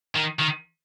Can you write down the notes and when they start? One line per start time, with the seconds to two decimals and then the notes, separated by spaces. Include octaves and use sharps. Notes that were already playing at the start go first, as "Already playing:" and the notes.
0.16 D#3
0.40 D#3